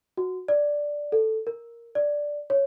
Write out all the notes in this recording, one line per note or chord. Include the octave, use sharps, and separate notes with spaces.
F#4
D5
A4
A#4
D5
C#5